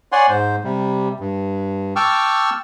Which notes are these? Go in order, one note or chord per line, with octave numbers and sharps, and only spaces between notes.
C#5 D5 F#5 G#5 C6
G#2 C5
C3 G3
G2
G5 A5 C#6 D6 E6 F6